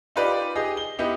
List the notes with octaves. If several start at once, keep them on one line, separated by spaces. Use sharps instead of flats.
D#4 F4 G4 B4 D5
G4 G#4 D#5
G7
B3 D#4 E4 G4